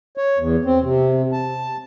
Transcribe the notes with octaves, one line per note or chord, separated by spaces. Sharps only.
C#5
E2
C4
C3
A5